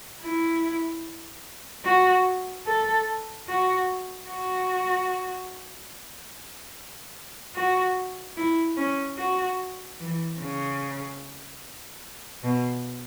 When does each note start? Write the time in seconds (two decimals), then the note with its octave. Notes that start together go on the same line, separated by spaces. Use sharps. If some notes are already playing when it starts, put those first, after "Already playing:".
0.22 E4
1.85 F#4
2.66 A4
3.48 F#4
4.29 F#4
7.55 F#4
8.36 E4
8.77 C#4
9.18 F#4
9.99 E3
10.40 C#3
12.44 B2